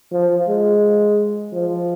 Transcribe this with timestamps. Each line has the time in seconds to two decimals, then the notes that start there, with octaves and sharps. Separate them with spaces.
0.13 F3
0.48 G#3
1.54 F3